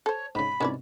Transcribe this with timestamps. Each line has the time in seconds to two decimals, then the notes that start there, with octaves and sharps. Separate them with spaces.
0.06 A4 C5 C#5
0.35 G#2 C#3 B5
0.61 C2 G#2 B2 C#4 E4 D5